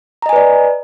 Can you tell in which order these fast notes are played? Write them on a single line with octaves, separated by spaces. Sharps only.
A#5 D#5 G#5 B4 D5